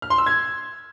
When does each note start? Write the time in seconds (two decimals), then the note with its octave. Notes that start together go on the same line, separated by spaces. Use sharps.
0.02 F6
0.10 C6
0.18 E6
0.26 G#6